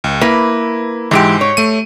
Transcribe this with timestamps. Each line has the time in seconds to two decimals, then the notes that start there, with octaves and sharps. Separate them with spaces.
0.04 C#2
0.21 A#3 E4 B4
1.11 G#2 E3 G#3 G4 D7
1.41 C#5
1.57 A3 D#7